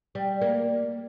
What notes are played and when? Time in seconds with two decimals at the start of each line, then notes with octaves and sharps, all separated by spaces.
0.15 G3
0.41 A#3